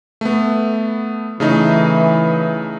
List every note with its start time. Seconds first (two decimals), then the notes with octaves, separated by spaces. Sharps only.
0.21 A3 B3
1.40 C#3 E3 A3 D#4